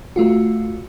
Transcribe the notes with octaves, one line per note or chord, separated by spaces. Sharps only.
A3 F4 F#4